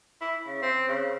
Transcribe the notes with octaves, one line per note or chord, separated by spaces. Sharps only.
E4
C#3
C4
C#3